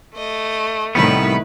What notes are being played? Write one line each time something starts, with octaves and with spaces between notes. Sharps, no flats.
A3 D#5
C2 A2 D#3 G3 B3 E4 B4